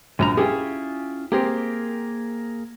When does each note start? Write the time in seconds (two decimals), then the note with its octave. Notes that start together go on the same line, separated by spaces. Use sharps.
0.19 A#1 F#2 C#3 B4 A#5
0.37 C#4 E4 F4 G4 G#4
1.32 A#3 C4 G4 G#4 A#4